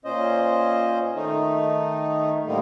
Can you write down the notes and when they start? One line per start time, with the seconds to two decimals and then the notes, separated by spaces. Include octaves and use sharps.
0.05 A#2 C#4 C5 D#5
1.15 D#3 A3 D#4
2.46 A2 D3 G3 A#3 D#4